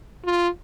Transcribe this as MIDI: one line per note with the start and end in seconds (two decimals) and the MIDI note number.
0.25 0.48 65